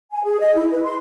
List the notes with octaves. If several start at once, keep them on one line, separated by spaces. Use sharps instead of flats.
G#5
G#4
D#5
E4
B4
C6